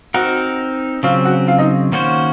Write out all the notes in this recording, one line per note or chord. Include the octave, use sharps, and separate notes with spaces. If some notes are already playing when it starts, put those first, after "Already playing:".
C4 D#4 F#4 A#4 F#5
C#3 F#3 C4 F4 F5
F#4 F#5
F4 F5
D#4 D#5
D#3 A#3 C#4 F#4 C5